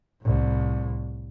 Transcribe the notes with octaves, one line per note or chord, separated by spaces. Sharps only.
C2 A2